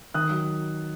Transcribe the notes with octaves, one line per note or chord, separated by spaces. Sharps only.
D#3 D#6 F#6
F#3